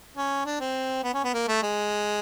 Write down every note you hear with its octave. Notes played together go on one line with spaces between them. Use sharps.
C#4
D4
C4
B3
C#4
B3
A#3
A3
G#3